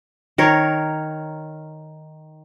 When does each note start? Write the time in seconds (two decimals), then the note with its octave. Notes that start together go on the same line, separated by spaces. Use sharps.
0.38 D#3 A#4 C#5